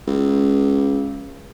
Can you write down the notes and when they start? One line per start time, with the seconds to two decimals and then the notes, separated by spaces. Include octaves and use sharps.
0.07 C#2